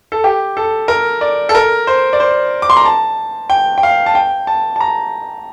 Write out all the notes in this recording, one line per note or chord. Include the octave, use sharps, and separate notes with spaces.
A4
G4
A4
A#4
D5
A4
A#4
C5
D5
C5
D6
C6
A#5
A5
G5
G5
F5
A5
G5
A5
A5
A#5